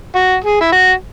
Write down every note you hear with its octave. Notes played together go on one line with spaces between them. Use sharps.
F#4
G#4
E4
F#4